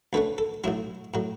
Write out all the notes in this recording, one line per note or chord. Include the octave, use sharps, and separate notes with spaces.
D2 D3 A3 C#4 B4
A4
B1 A2 F#3 E4
A2 F#3